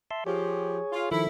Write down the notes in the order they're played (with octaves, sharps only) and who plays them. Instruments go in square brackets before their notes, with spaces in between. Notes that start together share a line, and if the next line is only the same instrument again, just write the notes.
[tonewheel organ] E5 A5 C6
[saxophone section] F3 G4 [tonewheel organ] G#4 C#5
[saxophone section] F4
[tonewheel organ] D#3 F3 [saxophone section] E4 A4